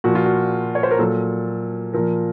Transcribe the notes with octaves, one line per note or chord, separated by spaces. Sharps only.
A#2 F3 F#4
F4
F#4
C#5
C5
A#4
A#2 F#3 A4
A#2 F3 A#4